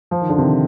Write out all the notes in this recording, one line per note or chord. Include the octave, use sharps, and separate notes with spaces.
F3
D#3
D3
C3 D#3